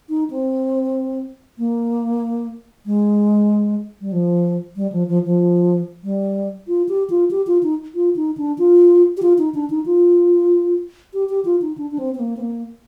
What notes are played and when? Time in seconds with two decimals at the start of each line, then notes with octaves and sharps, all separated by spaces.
0.09 D#4
0.30 C4
1.58 A#3
2.86 G#3
4.01 G3
4.12 F3
4.76 G3
4.92 F3
5.08 F3
5.25 F3
6.04 G3
6.68 F4
6.89 G4
7.10 F4
7.31 G4
7.47 F4
7.63 D#4
7.95 F4
8.16 D#4
8.37 D4
8.58 F4
9.17 G4
9.22 F4
9.38 D#4
9.54 D4
9.70 D#4
9.86 F4
11.13 G4
11.29 G4
11.45 F4
11.61 D#4
11.77 D4
11.91 D4
11.98 C4
12.14 C4
12.19 A#3
12.37 C4
12.40 A#3